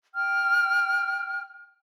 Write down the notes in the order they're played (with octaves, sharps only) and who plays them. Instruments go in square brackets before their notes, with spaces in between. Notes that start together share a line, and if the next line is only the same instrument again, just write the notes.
[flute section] G5 F6